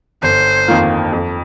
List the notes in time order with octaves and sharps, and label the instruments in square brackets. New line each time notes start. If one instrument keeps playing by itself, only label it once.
[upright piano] G1 [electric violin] C5
[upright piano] F2 D#3 A#3 F4
F2